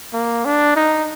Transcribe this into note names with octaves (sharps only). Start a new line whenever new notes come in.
A#3
D4
D#4